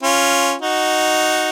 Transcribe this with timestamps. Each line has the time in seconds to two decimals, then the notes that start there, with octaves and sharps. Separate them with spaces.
0.03 C#4 F4
0.62 D#4 F#4